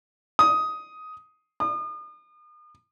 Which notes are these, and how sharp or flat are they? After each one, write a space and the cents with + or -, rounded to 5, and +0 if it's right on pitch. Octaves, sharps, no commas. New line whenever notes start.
D#6 +10
D#6 -40